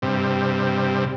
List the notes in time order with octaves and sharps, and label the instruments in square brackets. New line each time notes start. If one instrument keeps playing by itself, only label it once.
[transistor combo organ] G2 C3